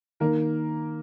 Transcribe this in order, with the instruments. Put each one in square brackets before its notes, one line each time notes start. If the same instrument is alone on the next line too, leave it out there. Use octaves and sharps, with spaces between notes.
[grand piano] D#3 [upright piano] A#3 A#4